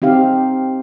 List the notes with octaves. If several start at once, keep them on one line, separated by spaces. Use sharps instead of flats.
C4 D#4 G4 F5